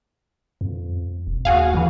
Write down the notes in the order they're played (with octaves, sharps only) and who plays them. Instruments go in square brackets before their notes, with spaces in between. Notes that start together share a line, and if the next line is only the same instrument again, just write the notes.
[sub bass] F2
E1
[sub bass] D#2 [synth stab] F#4 G#4 F5
[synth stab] F2 E3